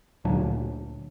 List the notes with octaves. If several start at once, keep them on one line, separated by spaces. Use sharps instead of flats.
D2 A#2 F#3 D4